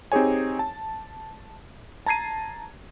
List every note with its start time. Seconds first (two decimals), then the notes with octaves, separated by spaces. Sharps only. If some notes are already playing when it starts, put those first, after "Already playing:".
0.12 C4 D#4 G4 G#4 C#5 G#5
0.59 A5
2.06 A5 A#5 G#6 C7 D#7